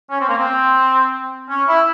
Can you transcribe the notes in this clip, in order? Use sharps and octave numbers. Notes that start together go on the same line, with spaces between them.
C#4
C4
A#3
C4
C#4
E4